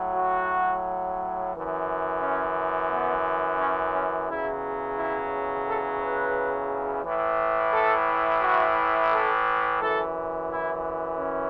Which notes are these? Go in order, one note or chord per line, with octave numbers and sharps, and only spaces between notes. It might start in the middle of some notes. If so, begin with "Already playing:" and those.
Already playing: A2 F#3
F#4
F#2 E3
C#4
B3
C#4
C#4
E2 C#3 F#3 E4
E4
A4
B4
A2 E3
A4
F#4
A4
F#2 E3 A4
E4
C#4